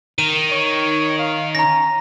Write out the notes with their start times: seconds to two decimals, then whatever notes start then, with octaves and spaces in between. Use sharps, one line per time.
0.18 D#3 A#4 D#7
0.51 C#5
1.19 F5
1.55 C#4 A#5 A#6